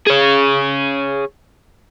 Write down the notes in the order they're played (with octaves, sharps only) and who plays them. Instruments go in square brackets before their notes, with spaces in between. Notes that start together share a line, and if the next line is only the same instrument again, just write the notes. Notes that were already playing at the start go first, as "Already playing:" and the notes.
[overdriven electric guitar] G#4 C#5